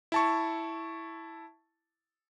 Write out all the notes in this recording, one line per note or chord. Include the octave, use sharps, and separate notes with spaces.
E4 A5 C#6